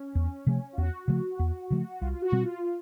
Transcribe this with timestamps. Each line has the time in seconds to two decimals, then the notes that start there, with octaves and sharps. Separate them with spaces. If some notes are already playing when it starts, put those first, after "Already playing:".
Already playing: C#4
0.15 E2
0.47 C3 F3 A3
0.73 F4
0.78 E2 F#4
1.08 C#3 F3 A3
1.39 E2
1.70 C#3 F3 A3
2.01 C2 F4
2.12 F4
2.22 F#4
2.32 B2 G3 C4
2.43 F4